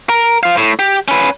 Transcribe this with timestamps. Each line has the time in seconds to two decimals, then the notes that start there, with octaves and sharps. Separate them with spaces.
0.09 A#4
0.43 C5 F5
0.57 A2
0.79 G4
1.08 C#4 B4